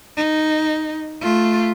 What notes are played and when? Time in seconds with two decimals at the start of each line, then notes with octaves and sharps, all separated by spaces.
0.17 D#4
1.22 A3 F4